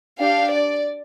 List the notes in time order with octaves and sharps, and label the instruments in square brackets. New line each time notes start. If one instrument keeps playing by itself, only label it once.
[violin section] D4 G4 F5
D5